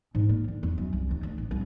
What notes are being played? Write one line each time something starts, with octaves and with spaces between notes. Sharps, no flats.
G#2
A#3
D3
E2
F#2
C2
D#2
D2
A1
C2